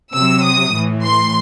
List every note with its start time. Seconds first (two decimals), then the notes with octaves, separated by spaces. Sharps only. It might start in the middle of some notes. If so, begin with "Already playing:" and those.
0.14 C3 F#3 E6
0.43 D#6
0.74 A2 E3
1.03 C6